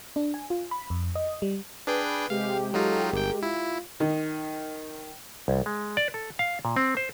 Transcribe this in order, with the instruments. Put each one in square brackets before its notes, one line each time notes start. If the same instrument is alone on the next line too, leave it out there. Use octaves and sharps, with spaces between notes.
[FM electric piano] D4
G#5
F4
B5
F2
D#5
G3
[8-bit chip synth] D4 G#4 G5 [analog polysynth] B4
[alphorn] C3 [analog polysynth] G#3 G4 [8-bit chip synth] F5
[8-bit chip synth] F#3 D#4 F4 [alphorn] A4
[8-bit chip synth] G1 G5 [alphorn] A#4
[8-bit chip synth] E4 [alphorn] F4
[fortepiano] D#3
[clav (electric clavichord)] C2
G#3
D5
A4
F5
A#2
C4
C5